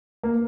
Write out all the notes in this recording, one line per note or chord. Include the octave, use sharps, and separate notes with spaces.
A#3